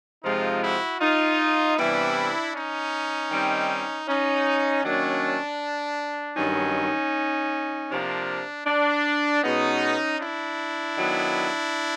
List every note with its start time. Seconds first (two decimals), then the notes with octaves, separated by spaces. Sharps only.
0.24 C3 F3 G#3 C4 D#4 F4
0.63 E4 F#4
1.00 D#4 F4
1.77 C3 E3 G3 B3 D4 E4
2.54 C#4 D#4
3.31 D#3 G3 C4
4.08 C#4 D#4
4.84 D#3 F#3 A#3 C#4 D4
6.36 G2 D#3 F#3 C#4 D#4
7.91 C3 F3 A#3 D4
8.66 D4
9.43 B2 G#3 B3 C#4 D#4
10.20 D4 E4
10.96 D#3 F#3 B3